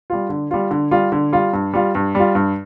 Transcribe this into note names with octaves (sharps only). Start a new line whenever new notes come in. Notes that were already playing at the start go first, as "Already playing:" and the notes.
G3 F4
D3
G3 F4
D3
G3 F4
D3
G3 F4
G2
G3 F4
G2
G3 F4
G2